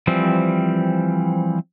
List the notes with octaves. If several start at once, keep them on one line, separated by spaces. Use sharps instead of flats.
E3 F3 G3 C4